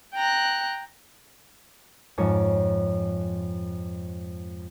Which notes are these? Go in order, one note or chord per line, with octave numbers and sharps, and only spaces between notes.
G5 A#5 F#6
F2 G#2 G#3 C#5 A5